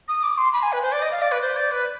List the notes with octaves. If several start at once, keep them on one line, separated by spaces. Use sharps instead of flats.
D#6
D6
C6
B5
G#5
B4
C5
D5
D#5
F5
D5
B4
C5
D5
B4